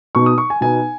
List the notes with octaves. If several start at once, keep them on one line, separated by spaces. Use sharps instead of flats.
B2 B3 D#4 C#6
D#6
C#6
G#5
B2 B3 D#4 G#5